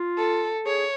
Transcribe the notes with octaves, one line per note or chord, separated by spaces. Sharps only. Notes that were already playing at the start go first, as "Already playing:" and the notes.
Already playing: F4
A4
G#4 C#5